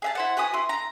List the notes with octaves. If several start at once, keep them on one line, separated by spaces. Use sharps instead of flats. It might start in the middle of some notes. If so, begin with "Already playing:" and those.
G#4 E5 A5
E4 C5 F#5
F#4 B4 G#5 D#6
E4 C6
A#5